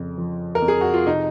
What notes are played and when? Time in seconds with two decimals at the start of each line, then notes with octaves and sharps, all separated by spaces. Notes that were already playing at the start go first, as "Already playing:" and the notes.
Already playing: F2 C#3
0.18 F3
0.55 A#4
0.62 F2
0.68 G#4
0.81 F#4
0.94 F4
1.07 C3 D#4